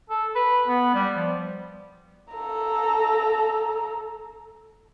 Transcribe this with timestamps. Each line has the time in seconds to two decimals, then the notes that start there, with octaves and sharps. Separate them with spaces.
0.10 A4
0.35 B4
0.67 B3
0.94 G3
1.16 F3
2.33 A4 A#5